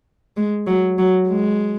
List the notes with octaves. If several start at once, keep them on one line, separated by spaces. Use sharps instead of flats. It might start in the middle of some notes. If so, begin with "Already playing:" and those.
G#3
F#3
F#3
G#3